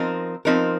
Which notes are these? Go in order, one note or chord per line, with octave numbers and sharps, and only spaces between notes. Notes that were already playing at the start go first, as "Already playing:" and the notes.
Already playing: F3 C4 D#4 A#4
F3 C4 D#4 A#4